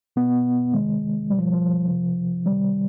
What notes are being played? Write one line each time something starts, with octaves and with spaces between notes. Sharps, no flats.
B2 B3
C3 D#3 G#3
B2 G3
F3
F3
C3 F3
C3 D#3 G3